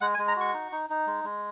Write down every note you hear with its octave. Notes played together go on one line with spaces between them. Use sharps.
G#3 F#5
G#5
G#3
A#5
F#4 C#6
D#4
D#4
D#4
G#3
G#3